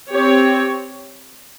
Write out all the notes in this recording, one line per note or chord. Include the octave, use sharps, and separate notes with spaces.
C4 G4 C#5